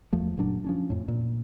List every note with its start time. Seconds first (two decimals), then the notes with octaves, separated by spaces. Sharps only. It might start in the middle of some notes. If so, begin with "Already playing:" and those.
0.13 E2 F3 A3
0.37 F#1 A#2 F#3 D4
0.64 F3 C#4 D4
0.90 F2 A2
1.08 A#2